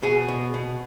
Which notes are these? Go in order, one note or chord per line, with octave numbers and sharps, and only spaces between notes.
B2 G#4
B2
B2